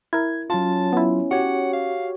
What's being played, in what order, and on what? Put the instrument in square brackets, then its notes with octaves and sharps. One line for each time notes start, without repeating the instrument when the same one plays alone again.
[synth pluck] E4 A#4 [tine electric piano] G#6
[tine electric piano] F#3 F4 [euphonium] C#4 [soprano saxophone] A5
[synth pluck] B3 E4
[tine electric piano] F#4 G4 C#5 [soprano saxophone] F#5
[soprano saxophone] F5